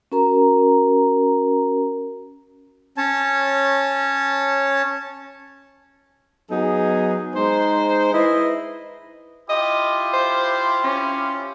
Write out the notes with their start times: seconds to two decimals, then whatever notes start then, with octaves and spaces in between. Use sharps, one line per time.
0.12 C#4 F#4 A#4 A#5
2.97 C#4 C#5 A5
6.50 F#3 B3 D#4 G#4
7.34 G#3 D#4 C5
8.12 E4 B4 D#5
9.50 E4 F4 G4 D#5
10.13 C5
10.84 C#4